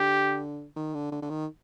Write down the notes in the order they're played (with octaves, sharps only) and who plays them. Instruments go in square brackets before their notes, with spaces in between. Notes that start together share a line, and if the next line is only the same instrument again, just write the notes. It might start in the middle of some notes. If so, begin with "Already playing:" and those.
Already playing: [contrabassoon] D3 [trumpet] G4
[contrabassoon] D#3
D3
D3
D3
D#3